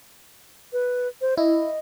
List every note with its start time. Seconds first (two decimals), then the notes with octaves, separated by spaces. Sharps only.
0.73 B4
1.21 C5
1.37 E4 D#5